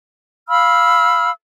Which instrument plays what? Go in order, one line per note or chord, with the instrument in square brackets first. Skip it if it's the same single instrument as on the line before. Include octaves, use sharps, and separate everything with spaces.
[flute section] F5 B5 E6 F6